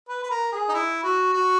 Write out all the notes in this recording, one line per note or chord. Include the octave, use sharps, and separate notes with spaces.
B4
B4
A#4
G#4
D#4
E4
F#4
F#4